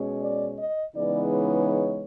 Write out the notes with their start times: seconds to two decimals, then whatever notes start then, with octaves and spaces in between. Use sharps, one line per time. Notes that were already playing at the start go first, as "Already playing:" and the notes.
Already playing: B2 G#3 C#4
0.22 D5
0.59 D#5
0.96 C#3 E3 G#3 B3 D#4 D5
1.32 C#5